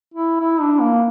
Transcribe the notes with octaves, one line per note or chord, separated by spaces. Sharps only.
E4
E4
D4
A#3